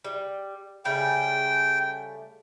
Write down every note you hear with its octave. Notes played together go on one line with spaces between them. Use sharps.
G3
C#3 G3 A3 G5